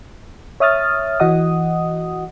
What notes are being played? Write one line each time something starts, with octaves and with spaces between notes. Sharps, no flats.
C#5 E5 D#6 F6 A6
E3 F#4 D#5 F#5 D#6